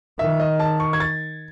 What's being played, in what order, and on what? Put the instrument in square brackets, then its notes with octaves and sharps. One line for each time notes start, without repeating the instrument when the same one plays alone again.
[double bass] D#3 [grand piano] E5
[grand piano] D#5
A5
C#6
G#6
A6